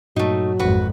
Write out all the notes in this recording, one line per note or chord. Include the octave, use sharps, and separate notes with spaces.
G2 A#2 F#3 A3 A#3 D#4
G#1 F2 F#4 B4